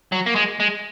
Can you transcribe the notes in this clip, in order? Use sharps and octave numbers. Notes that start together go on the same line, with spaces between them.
F#3
A#3
G#3
G#3